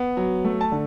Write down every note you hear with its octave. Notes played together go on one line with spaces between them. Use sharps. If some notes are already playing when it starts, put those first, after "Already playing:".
Already playing: B3
F#3
A3
A5
D3